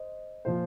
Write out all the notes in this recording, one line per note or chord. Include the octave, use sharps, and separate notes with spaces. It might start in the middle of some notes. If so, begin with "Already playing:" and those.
Already playing: C5 D#5
A#2 F3 C5